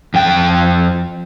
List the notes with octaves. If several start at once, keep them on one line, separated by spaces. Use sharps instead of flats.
F2 G5